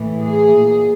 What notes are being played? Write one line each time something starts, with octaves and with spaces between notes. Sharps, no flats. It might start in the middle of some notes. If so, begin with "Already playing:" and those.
Already playing: A2 E3
G#4
A#2